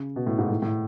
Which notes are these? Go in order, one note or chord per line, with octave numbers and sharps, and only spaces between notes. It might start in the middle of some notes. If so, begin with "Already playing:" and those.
Already playing: C#3
B2
A2
G#2
A2
A2